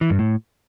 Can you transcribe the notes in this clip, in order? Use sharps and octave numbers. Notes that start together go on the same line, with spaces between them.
E3
G2
A2